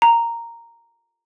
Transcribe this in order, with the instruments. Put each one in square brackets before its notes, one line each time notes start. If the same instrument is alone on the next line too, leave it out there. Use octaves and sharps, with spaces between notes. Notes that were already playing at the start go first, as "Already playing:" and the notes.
[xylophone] A#5